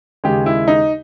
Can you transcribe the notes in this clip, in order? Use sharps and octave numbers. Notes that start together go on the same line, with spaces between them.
D#2 C#3 G#3 G4
E4
D#4